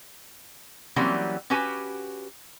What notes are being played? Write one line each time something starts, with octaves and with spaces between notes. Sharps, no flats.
E3 F#3 G3 A#3 C4 C#4
C#4 F#4 G4 B4 G#5